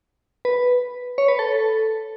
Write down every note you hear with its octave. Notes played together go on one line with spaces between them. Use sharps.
B4
C#5
B4
A4